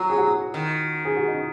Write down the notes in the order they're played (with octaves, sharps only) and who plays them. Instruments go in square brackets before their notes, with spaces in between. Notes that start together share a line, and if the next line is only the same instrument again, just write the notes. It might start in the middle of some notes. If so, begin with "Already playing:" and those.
Already playing: [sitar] F#3 [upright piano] F#4
[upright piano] G#4
F#4
[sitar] D#3
[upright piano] G#4
F#4
D#4